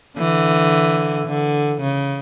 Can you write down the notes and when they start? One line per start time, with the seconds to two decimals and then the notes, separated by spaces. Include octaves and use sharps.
0.18 D3 E3
1.27 D3
1.81 C#3